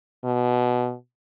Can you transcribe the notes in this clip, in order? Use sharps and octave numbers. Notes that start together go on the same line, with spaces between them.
B2